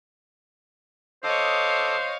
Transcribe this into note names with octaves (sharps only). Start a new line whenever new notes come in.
A4 C5 C#5 D#5 F5 D6 D#6